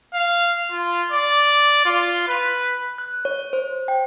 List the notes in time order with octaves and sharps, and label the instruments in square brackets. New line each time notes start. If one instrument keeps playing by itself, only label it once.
[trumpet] F5
F4
D5
F4
B4
[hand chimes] F#6
C#5
C5
G5